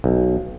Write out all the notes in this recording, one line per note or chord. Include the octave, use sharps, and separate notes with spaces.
B1